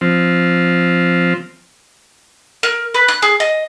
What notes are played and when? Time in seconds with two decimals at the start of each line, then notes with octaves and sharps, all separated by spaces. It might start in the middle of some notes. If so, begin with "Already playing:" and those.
0.01 F3 C4
2.63 A#4
2.94 B4
3.08 F#6
3.22 G#4
3.40 D#5